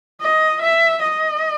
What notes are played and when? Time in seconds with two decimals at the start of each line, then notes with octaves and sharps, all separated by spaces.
0.21 D#5
0.62 E5
1.03 D#5